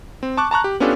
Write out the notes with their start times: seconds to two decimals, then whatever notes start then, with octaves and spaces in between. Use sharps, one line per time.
0.23 C4
0.37 A5 C#6 D6 F#6
0.51 A5 A#5 C#6 F#6
0.64 G4
0.80 B3 C#4 D4 F4 G4 A4